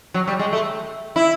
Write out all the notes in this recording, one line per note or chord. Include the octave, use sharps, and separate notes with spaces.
F#3
G3
G#3
A3
E4